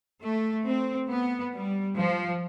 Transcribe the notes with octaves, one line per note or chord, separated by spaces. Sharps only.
A3
C4
B3
G3
F3